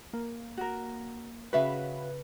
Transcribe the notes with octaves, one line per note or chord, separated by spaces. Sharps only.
A#3
F#4 A#4
C#3 F#4 B4 E5 F5